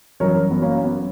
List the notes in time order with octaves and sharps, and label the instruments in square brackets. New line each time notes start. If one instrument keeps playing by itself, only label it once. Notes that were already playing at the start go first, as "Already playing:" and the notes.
[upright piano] G1 F#2 E3 A#4 C#5
B3
A#3 C#4
B3